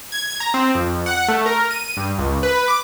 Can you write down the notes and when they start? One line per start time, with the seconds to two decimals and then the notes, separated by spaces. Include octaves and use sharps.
0.12 G#6
0.40 A#5
0.54 C4
0.75 F2
1.06 F#5
1.28 A3
1.46 A#4
1.71 D#7
1.97 G2
2.18 C#2
2.43 B4
2.68 D6